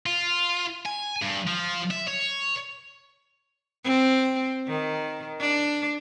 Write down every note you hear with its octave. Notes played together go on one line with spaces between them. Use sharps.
F4
G#5
G2
F3
E5
C#5
C4
D#3
D4